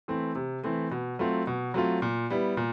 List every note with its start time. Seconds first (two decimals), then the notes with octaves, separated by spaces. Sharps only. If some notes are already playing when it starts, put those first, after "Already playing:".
0.08 E3 A3 C4
0.35 C3
0.63 E3 A3 C4
0.91 B2
1.19 F#3 A3 C4 F4
1.47 B2
1.74 F#3 A3 C4 F4
2.02 A#2
2.30 G3 B3 E4
2.57 A#2